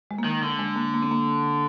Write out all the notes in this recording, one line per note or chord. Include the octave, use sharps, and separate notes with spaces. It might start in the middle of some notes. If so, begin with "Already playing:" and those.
G#3
A#3
D#3
D3
G#3
A#3
A#3
C4
A#3